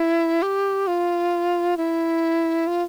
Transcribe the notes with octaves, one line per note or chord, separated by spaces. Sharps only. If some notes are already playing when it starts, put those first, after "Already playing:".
Already playing: E4
G4
F4
E4
F4